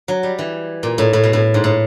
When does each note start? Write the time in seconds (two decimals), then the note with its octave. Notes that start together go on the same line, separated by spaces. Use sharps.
0.08 F#3
0.23 G3
0.39 E3
0.83 A#2
0.98 A2
1.13 A2
1.24 B2
1.33 A2
1.54 G#2
1.64 A2